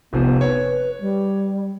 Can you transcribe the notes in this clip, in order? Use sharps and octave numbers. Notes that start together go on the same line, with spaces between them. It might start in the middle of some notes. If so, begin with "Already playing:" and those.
F1 C3 F3 B3
B4 C#5
G3